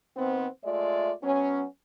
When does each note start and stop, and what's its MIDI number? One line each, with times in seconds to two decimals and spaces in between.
0.17 0.47 51
0.17 0.47 59
0.17 0.47 60
0.65 1.13 56
0.65 1.13 57
0.65 1.13 65
0.65 1.13 74
0.65 1.13 76
1.24 1.64 54
1.24 1.64 59
1.24 1.64 61